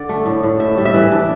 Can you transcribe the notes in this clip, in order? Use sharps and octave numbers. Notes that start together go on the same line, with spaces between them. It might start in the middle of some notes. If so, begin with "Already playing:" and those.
Already playing: D3 D5
A3
A2
A2
A2 E5
G3
E5
E3
D4